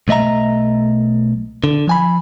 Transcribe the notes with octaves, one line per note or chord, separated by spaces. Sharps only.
B1 A3 D#5 E5 A#5
D3
F3 G#5 B5